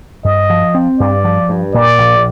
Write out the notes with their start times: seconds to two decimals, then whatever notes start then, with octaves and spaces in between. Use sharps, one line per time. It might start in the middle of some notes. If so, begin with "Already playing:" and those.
0.25 G2 D#5
0.50 F3
0.75 C4
1.00 G2 D5
1.24 F3
1.49 G2
1.74 A#2 D5
1.98 A#1